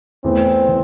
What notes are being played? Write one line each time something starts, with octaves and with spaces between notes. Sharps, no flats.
E2 E3 A3 C4
E3